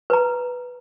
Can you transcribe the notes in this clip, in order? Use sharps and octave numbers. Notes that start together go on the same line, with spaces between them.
B4 A#5